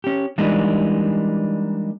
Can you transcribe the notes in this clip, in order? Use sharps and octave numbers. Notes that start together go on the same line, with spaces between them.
C#4 G4
E3 G3 G#3 A#3 D4 D#4